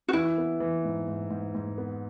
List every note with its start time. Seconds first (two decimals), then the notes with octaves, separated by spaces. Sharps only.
0.08 F#4
0.13 E3 E4
0.38 B3
0.60 E3
0.85 G#2
1.08 G#2
1.30 G#2
1.55 G#2
1.78 B3